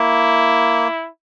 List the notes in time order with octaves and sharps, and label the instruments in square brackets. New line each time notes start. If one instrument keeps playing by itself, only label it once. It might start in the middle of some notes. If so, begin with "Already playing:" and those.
Already playing: [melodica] A#3 [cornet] E4